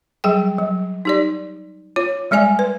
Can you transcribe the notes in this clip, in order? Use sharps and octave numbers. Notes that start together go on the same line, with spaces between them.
F#3 G3 G#4 G5
F#3
D#4 G4 D5
F4 C#5
G3 G#3 D5 E5 G#5
B4